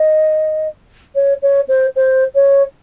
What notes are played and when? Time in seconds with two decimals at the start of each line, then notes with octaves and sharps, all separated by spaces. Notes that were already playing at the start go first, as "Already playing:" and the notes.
Already playing: D#5
1.15 C#5
1.42 C#5
1.68 C5
1.96 C5
2.35 C#5